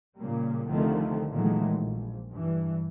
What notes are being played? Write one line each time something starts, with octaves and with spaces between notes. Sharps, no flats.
A#2 C#3 G3 A#3
C2 D3 D#3 F3 A3 C4
A#2 D#3 E3 F#3 G#3 A3
A#1
G2 E3